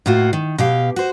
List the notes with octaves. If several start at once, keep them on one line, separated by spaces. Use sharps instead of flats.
A2 A#3 F4 F#4
D#3
B2 G4 F5
F#4 C5